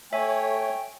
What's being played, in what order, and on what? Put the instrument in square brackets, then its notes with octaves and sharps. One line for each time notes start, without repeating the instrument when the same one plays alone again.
[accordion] A3 C#5 [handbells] E5 G#5 [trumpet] G5